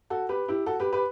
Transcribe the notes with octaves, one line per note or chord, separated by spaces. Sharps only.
F#4 A4
G4 B4
E4 G4
F#4 A4
G4 B4
G4 B4